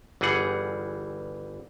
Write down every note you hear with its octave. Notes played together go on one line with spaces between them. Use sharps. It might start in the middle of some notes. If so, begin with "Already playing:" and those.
G1 E3 G3 G#4 F#5